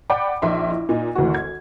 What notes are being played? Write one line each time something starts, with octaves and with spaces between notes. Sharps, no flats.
D5 F#5 G5 B5 D6
A#1 D#4 E5 C6
E4
A#2 D#4
G#1 D2 E3 F#4
G#6